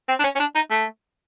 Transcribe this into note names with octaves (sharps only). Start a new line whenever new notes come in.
C4
D4
C#4
C#4
D4
D#4
A3